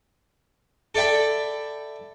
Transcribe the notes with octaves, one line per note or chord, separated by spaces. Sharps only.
A4 D5 E5 G5 B5